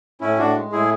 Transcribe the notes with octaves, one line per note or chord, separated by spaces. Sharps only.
A2 C#4 E4
A2 D4 F#4
G#3
A2 E4 G#4